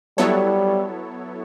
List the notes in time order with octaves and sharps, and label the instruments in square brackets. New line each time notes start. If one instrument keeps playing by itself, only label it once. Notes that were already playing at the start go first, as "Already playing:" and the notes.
[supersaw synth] F#3 B3 E4 A4 C#5 [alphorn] G3